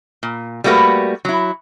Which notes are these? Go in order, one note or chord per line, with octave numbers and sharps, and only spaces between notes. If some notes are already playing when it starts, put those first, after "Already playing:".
A#2
G3 A3 A#3 F#4 B4
F#3 E4